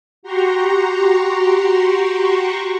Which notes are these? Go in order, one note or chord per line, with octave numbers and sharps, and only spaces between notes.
F#4 G4 A#5 C6 C#6